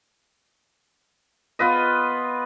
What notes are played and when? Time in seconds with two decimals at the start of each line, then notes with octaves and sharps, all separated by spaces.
1.59 B3 F4 B4 D#5